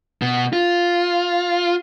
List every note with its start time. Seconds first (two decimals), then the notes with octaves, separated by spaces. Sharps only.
0.22 B2
0.53 F4